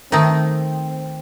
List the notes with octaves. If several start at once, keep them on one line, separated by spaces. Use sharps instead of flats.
D#3 A3 C4 D#4